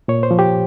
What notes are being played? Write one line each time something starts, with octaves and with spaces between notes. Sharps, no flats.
A#2 C#5
C5
F3
G4